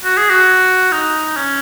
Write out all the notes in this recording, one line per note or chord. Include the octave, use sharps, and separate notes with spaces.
F#4
G#4
F#4
D#4
C#4